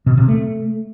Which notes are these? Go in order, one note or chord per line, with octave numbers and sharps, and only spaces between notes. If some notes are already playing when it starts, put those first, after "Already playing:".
B2
C3
A3